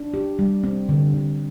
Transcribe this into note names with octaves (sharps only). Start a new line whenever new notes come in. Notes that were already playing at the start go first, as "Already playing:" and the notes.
Already playing: D4
G4
G3
C4
D3
D3